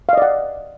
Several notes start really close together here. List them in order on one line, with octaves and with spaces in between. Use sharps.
F5 D#5 D5 F#5